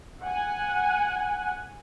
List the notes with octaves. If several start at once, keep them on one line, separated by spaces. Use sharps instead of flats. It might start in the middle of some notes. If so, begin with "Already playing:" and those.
F#5 G#5